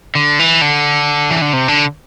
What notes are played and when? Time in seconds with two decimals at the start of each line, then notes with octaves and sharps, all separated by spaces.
0.15 D3
0.39 E3
0.62 D3
1.31 E3
1.42 D3
1.53 C3
1.68 D3